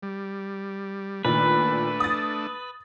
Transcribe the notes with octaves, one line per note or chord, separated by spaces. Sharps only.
G3
A#2 D#3 A3 D4 B4
D#6 A6